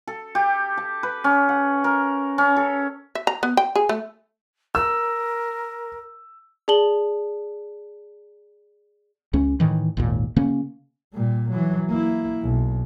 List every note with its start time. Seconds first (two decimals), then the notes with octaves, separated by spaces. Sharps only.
0.07 A4
0.35 G4
0.77 A5
1.03 B4
1.24 C#4
1.49 F#5
1.84 A#4
2.38 C#4
2.56 A4
3.15 E5
3.27 A#5
3.43 B3
3.57 G5
3.75 G#4
3.89 A3
4.75 A#4 E6
6.68 G#4 D5 A5 F#7 G7
9.33 C#2 C#4
9.60 A2 D#3 E3
9.97 G#1 D#2 A#2
10.36 C#3 A#3 C#4
11.14 A#2 G3
11.52 E3 F#3
11.89 A#3 E4
12.43 B1